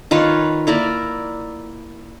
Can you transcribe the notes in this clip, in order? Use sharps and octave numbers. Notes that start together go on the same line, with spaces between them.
D#3 F4 B4 C#5
A#3 E4 A#4 D5